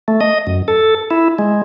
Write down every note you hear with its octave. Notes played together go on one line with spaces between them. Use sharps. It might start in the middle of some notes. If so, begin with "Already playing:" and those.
A3
D#5
F#2
A4
E4
G#3